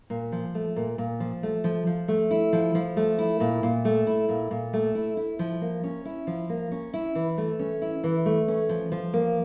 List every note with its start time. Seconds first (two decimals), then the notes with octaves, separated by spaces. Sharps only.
0.10 A#2
0.32 F3
0.55 A3
0.76 A#2
0.98 A#2
1.20 F3
1.43 A3
1.64 F3
1.87 F3
2.08 A3
2.31 E4
2.53 F3
2.75 F3
2.97 A3
3.19 E4
3.40 A#2
3.63 A#2
3.85 A3
4.07 E4
4.29 A#2
4.51 A#2
4.73 A3
4.95 E4
5.17 E4
5.39 F3
5.61 A#3
5.84 C#4
6.05 E4
6.27 F3
6.49 A#3
6.71 C#4
6.94 E4
7.15 E3
7.38 A3
7.59 C#4
7.82 E4
8.04 E3
8.26 A3
8.48 C#4
8.69 F3
8.92 F3
9.14 A#3